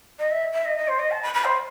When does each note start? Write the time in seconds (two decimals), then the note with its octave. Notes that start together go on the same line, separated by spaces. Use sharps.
0.19 D#5
0.31 E5
0.53 E5
0.65 D#5
0.77 D#5
0.88 C5
0.99 D#5
1.11 A5
1.22 B5
1.34 B5
1.45 C5